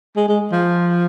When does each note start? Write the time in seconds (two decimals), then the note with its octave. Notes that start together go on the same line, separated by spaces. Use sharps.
0.16 G#3
0.28 G#3
0.52 F3